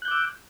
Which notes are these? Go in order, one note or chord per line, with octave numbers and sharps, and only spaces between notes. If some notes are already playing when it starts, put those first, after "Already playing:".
D6 E6 F#6 G6